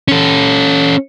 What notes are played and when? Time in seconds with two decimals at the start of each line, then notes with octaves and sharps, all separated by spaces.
0.08 C#4 A4